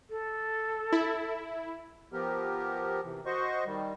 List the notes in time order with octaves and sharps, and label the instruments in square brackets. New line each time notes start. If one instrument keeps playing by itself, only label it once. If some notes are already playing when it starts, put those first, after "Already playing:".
[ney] A4
[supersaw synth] E4
[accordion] F3 B3 G4 A#4
C3 E3
F#4 C5 D#5 C#6
D#3 G3